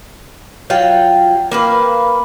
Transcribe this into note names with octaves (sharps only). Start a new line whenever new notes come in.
F#3 F4 G5
A#3 B4 F5